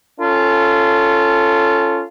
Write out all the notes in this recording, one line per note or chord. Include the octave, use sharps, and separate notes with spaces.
C#4 F4 A4